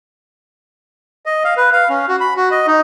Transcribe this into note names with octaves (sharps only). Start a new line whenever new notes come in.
D#5
F5
B4
F5
C#4
F#4
B5
F#4
D#5
D#4